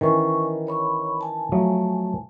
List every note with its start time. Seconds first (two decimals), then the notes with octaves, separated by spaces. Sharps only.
0.01 D#3 E3 C#4 G#5 C#6
0.67 C#5 B5 C#6
1.21 G#5 A5
1.52 F3 F#3 A3